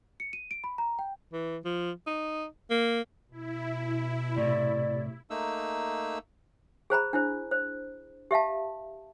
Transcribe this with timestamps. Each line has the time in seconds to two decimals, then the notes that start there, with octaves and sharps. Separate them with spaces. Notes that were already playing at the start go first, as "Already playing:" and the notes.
0.20 C#7
0.33 D#7
0.51 D7
0.64 B5
0.78 A#5
0.99 G5
1.33 E3
1.65 F3
2.06 D#4
2.70 A#3
3.31 B2 E4
4.36 A2 C3 D5
5.30 A3 A#3 D#4 E6
6.90 G#4 C5 A#5 B5
7.13 D4 E4 C5
7.51 C5
8.31 G4 E5 F5 A5